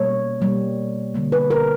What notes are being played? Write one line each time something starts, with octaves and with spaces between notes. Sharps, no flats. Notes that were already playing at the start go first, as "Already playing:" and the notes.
Already playing: B2 G3 A#3 C#5
B2 G3 A#3
D3 G3 A#3
B4
A#4